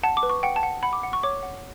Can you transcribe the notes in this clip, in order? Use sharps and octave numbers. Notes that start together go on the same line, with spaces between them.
F#5 A5
D6
B4
C#6
F#5 G5
A5
F#5
F#5 B5
D6
F#5
C#6
C#5 D6
F#5